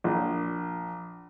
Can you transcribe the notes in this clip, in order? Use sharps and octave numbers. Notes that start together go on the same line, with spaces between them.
A#1